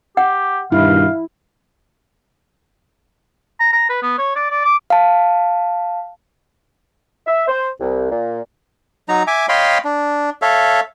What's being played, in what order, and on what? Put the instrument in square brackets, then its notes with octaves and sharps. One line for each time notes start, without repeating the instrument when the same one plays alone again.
[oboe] G4 [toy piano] F#5
[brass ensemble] G2 B2 D#3 [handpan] E4 [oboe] F5
[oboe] A#5
A#5
B4
B3
C#5
D5
D5
D6
[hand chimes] F5 A5
[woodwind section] E5
C5
C2
A#2
[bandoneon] F#3 D#4 A#5
E5 G#5 D6
C#5 D#5 F5 G5 B5 C6
D4
A4 C#5 E5 F5